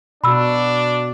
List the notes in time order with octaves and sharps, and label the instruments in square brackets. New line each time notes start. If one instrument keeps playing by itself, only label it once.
[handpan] B2 F#4 [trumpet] D4 [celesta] B5 E6